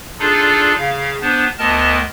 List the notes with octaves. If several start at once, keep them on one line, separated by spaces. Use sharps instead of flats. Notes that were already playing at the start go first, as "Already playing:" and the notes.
D4 D#4 F4 G#4 A4 D5
C#3 F5
B3 D4 C5
D2 B3 A#4 D#5 A5